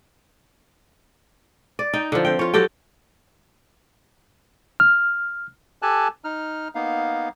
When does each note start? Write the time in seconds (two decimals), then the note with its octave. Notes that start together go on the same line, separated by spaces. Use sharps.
1.79 D5
1.93 D#4 G5
2.12 D3 F3
2.25 C4 G5
2.39 F4 C#5
2.54 F#3 G4 A4 G5
4.80 F6
5.82 G4 A4 G#5 A5 F#6
6.24 D#4 F6
6.75 A#3 B3 D#4 F5